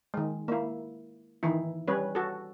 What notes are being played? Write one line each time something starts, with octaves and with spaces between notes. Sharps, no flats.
D#3 G#3
A#3 E4
D#3 E3 D#4 E4
G3 C#4 B4 C#5
F#4 A4